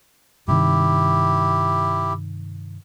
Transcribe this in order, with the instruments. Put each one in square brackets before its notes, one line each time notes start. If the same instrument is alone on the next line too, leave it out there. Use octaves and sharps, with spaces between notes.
[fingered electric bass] G2 C3 D#3 [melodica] E4 G4